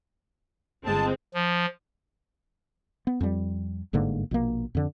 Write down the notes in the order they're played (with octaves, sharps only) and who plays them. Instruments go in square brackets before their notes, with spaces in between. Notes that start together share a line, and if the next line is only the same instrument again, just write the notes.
[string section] G1 G#3 C4 [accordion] A5
[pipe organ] F3
[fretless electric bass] B3
F2 G3
G1 G#2 D3 A#3
A#1 B2 A#3
F2 D3